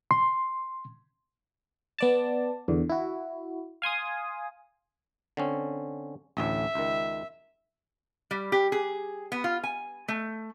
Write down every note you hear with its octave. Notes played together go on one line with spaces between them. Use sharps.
C6
B3 D5 A5
E2 D3
E4 F#4
F5 G#5 C6 D#6
D3 C4 C#4
A1 D2 A2 E5
C#2 D#3
G3
G4
G#4
B3
F4
G#5
A3